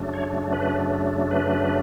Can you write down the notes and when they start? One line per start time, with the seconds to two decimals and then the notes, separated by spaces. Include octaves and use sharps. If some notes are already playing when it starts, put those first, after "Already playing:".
Already playing: F#2 C#3 F#3 A3 D4
0.14 C#5
0.53 B4
1.31 B4